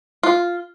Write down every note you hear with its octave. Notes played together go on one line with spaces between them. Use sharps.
F4